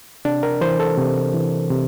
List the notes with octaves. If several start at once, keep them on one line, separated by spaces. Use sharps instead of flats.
C3 D4
A#4
E3 C5
A4
C3
E3
C3